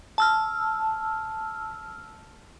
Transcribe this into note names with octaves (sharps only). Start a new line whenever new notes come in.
A5 E6 F6